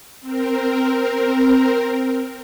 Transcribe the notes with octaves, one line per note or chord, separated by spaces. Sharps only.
C4 A#4